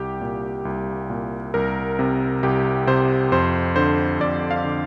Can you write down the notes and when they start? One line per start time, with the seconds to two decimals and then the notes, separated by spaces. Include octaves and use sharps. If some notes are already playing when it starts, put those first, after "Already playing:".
Already playing: C2 G4
0.21 A#2
0.65 C2
1.10 A#2
1.54 C2 A#4
1.99 C3
2.43 C2 G4
2.87 C3 C5
3.32 F2 C5
3.76 D3 C5
4.20 F2 D5
4.51 F5
4.64 D3